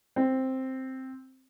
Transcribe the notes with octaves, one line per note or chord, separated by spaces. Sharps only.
C4